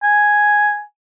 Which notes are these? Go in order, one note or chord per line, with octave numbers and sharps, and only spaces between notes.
G#5